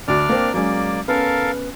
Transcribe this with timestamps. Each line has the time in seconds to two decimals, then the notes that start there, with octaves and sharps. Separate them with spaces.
0.08 D2 D4 F#4 D5 F6
0.29 A#3 C4
0.54 F#3 G#3 A#3 C#4 D5
1.08 B3 C#4 A4 A#4 F5